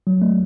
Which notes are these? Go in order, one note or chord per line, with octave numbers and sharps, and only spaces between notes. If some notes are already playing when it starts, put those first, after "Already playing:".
F#3
A3